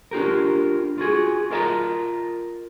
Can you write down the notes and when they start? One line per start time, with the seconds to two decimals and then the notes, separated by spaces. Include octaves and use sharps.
0.11 D4 F4 G4 A#4
0.98 F4 F#4 G#4
1.51 F4 A#4 D#5 A5 A#5